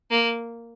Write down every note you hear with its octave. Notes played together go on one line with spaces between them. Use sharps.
A#3